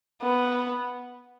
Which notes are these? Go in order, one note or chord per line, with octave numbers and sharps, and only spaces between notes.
B3